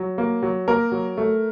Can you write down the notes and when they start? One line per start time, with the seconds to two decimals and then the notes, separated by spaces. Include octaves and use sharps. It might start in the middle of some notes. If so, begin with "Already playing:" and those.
Already playing: F#3
0.18 A#3
0.43 F#3
0.68 A#3 A#4
0.92 F#3
1.17 A3